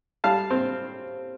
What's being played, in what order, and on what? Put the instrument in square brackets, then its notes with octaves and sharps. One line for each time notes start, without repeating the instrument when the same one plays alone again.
[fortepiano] G3 F5 A5
C4